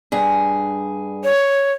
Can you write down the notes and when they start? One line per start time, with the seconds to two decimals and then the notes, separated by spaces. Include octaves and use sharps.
0.12 G2 G#4
1.24 C#5